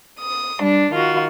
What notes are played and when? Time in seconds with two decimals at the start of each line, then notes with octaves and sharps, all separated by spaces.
0.20 D#6
0.60 G3 D4
0.92 D#3 F4 F#4